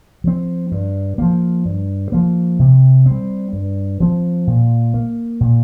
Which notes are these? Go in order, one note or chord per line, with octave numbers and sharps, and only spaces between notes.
F3 C4
G2
F3 A#3
G2
F3 A#3
C3
C4
G3
G2
F3 C4
A#2
A#3
A#2